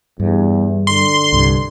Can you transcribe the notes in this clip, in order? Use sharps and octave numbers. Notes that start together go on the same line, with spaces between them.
E2 G2
D3 C6
C2 G2